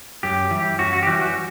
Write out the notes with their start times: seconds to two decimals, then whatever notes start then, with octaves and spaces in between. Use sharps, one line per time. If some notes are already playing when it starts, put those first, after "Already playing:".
0.23 F#2 G4
0.51 E3 G3
0.79 F#2 F#4
0.93 F#4
1.03 G4
1.07 E3 G3 F#4
1.21 F#4